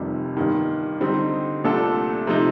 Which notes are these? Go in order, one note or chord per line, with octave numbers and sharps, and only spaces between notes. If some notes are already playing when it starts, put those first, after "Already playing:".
Already playing: F1 F2 C3 D#3 G3
G1 G2 D#3
D3 G3 C4 D#4
C2 A#2 A3 D4 A4
C3 F3 A3 D#4